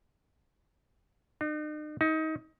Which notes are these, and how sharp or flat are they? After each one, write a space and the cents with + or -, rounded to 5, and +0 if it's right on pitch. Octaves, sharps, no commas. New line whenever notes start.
D#4 -45
D#4 +25